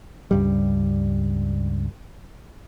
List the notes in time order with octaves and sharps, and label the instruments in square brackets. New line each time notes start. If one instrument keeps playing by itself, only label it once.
[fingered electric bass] C#2 G2 G3